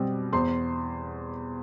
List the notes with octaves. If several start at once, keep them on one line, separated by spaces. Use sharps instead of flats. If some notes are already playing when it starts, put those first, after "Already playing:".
Already playing: B2 G3 C4
E2 C5 C6